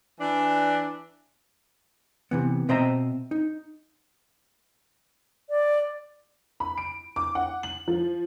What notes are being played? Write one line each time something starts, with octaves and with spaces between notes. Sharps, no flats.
E3 D4
C3 E3 B3
B2 C4 C5 D#5 E5 A#5
D#4
D5
B5
D7
D6
F#5
F#7
F3